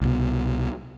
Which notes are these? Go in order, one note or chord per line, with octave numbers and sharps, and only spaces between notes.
C2 B2